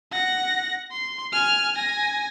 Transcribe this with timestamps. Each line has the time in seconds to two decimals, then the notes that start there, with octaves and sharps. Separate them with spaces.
0.12 F#5 A#6
0.91 C6
1.32 G#5 F6
1.75 G#5 A#6